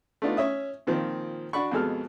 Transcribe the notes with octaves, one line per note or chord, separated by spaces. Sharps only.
A3 B3 D4 D#4 F4
C#4 C#5 E5 D#6
A#2 D#3 F3 C4
D4 F#4 D5 B5 C#6
F2 B2 G#3 A4 F6